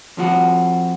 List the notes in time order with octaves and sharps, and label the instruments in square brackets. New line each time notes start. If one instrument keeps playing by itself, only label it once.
[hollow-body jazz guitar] F2 F3 F#4